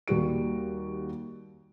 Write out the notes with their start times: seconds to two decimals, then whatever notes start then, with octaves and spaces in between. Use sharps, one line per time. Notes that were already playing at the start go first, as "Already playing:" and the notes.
0.08 D#2 G3 F#4 D7